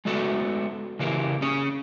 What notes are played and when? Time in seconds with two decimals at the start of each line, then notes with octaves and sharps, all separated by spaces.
0.05 G#3 A3 B3 F#4 A4
0.99 C#3 E3 A#3 G4
1.42 C#4 G#4